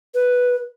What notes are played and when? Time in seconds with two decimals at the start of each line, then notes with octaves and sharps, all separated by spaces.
0.15 B4